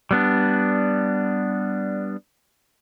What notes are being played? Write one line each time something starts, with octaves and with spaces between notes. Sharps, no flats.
G3 B3 D4